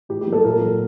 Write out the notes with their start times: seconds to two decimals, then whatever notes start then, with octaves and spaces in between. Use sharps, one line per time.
0.09 A2 G4
0.21 G4
0.27 F#3 A#3
0.33 A4
0.45 A#2 A#4
0.61 F#3 A#3